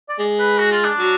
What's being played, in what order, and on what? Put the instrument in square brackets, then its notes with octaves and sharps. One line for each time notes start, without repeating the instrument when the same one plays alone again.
[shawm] D5
[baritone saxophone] G#3
[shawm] B4
F#4
F4
D4
[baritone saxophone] F#3